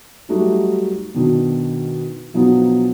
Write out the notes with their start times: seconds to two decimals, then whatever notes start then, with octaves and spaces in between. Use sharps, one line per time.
0.29 F#3 G3 A3 D#4 F#4 G4
1.14 B2 D#3 D4 F#4
2.34 B2 F3 F#3 B3 D4 D#4